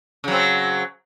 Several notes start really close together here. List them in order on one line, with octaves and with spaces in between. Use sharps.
C#3 F#3 C4